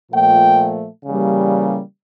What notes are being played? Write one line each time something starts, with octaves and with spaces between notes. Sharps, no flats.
A#2 F3 A3 G5
C#3 E3 G3 A#3